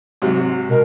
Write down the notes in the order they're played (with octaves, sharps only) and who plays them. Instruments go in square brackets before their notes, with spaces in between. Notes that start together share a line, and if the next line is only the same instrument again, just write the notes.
[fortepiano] G#2 C3 F#3
[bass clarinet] B2 [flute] A#4